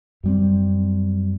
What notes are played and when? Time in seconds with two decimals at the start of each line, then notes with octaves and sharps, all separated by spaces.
0.24 F#2 G3 C4